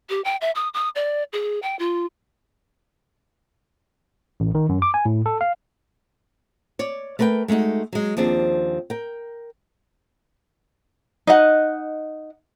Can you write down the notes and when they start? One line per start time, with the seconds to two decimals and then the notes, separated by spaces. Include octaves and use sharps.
0.09 G4
0.24 G5
0.41 E5
0.55 D#6
0.74 D#6
0.95 D5
1.33 G#4
1.62 G5
1.79 F4
4.40 A1
4.55 D#3
4.69 F#2
4.82 D6
4.94 G#5
5.05 A2
5.26 A4
5.41 F5
6.79 C#5 D5
7.19 A3 A#4 B4 D5 G5
7.48 G#3 A3 D4 D#4 F#4
7.93 F#3 G#3
8.17 D#2 F3 C4 D4 G#4
8.90 A#4 G5
11.27 D#4 D#5 F#5